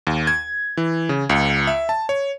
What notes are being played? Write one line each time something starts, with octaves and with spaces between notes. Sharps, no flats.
D#2
G#6
E3
C#3
C#2
E5
A5
C#5